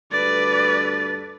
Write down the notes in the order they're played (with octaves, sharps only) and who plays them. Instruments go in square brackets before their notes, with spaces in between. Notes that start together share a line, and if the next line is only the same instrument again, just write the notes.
[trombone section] D2 G2 A4 [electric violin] B4 D5 [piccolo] A6